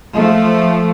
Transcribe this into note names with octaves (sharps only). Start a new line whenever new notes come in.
F3 A3